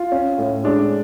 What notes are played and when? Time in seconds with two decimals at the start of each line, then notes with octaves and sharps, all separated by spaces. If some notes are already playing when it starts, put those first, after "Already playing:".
Already playing: F4
0.12 C#4
0.38 A2
0.64 G#3 D4